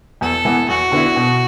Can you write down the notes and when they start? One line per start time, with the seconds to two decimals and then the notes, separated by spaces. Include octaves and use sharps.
0.21 E2 A4
0.45 E3 B3
0.69 E2 F#4
0.92 D3 B3 E4
1.16 B2